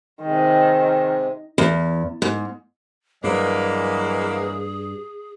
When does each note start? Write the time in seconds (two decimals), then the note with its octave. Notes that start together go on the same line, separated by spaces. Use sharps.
0.23 C3 D#3 G#3
1.58 E2
2.22 G#2
3.24 G2 E3 F#3 G#3 A#3 G#4